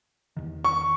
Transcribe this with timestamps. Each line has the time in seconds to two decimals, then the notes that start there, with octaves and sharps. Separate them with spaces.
0.37 E2 D#3
0.64 C#6